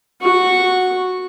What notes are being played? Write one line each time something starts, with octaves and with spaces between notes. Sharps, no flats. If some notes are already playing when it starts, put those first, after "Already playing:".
F#4 C#6